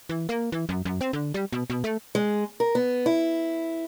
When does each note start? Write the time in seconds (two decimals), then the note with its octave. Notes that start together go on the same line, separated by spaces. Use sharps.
0.09 E3
0.29 A#3
0.52 E3
0.69 F#2
0.85 F#2
1.01 C4
1.13 D3
1.34 G3
1.52 B2
1.70 B2
1.84 A3
2.15 G#3
2.60 A#4
2.75 B3
3.06 E4